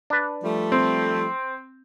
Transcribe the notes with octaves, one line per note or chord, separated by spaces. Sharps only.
D4 B4
F3 G3 A3
C4